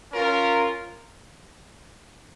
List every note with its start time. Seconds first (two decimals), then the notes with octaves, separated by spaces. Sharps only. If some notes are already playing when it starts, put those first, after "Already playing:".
0.12 C#4 F4 A#4